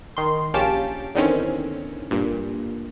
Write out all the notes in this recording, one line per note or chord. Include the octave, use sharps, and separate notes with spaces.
D#3 C6
A#1 C#4 G4 F5 A5 D7
E2 D3 D#3 C4 C#4
G2 A#2